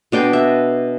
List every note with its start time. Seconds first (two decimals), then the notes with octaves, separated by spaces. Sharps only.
0.12 B2 D4 G5 C6
0.33 E5